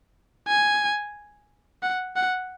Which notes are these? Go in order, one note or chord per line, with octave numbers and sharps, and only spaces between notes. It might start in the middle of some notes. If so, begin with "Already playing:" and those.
G#5
F#5
F#5